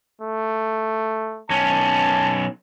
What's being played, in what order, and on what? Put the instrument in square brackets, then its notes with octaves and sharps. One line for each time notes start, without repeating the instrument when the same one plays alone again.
[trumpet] A3
[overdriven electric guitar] B1 C#4 [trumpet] A5